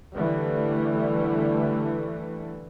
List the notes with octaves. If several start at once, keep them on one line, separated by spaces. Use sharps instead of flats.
D3 E3 G3 A3